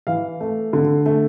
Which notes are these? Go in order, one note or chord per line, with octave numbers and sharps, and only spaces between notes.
E3 F5
A3
D3
A3